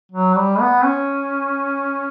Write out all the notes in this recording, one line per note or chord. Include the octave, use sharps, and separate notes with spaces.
F#3
G3
B3
C#4